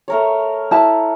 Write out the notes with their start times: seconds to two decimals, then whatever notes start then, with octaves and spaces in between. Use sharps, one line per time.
0.08 A3 A#4 C#5
0.71 E4 A5